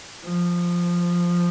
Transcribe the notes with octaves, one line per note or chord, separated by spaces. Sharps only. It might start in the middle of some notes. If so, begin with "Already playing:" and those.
F3